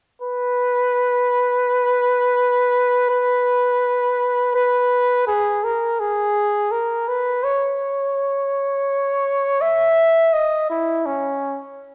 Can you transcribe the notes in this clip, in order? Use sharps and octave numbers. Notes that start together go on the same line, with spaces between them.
B4
B4
B4
G#4
A#4
G#4
A#4
B4
C#5
E5
D#5
E4
C#4